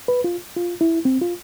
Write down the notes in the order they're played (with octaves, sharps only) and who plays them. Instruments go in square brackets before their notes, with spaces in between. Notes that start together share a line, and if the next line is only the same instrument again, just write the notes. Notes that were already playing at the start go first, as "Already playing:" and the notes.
[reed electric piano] B4
F4
F4
E4
C4
F4